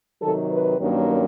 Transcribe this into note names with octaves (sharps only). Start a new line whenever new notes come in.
C3 D#3 F#3 A4
B4
G2 D#3 F#3 A#3 C#4